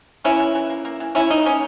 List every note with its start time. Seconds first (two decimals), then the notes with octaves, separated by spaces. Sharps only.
0.24 A#3 C#4 E4
0.39 E3
0.55 E3
0.70 A#3
0.85 A#3
1.00 E3
1.15 E3 C#4 E4
1.30 A#3 D#4
1.46 A#3 C#4